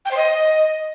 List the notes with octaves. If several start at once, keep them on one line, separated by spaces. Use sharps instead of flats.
G5
C5
D#5